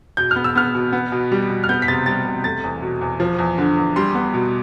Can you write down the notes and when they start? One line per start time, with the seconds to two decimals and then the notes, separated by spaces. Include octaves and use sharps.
0.17 B2 G6
0.31 B3 F6
0.44 E6
0.55 B3 F6
0.74 B2
0.93 B3
1.12 B2
1.32 G3
1.50 B2
1.64 F6
1.69 B3 G6
1.82 B6
1.88 C3 A6
2.06 G3 A6
2.26 C3
2.44 A3 A6
2.64 E2
2.82 B2
3.01 E2
3.20 F3
3.39 E2
3.58 D3
3.77 E2
3.96 G3 C6
4.15 B3
4.34 B2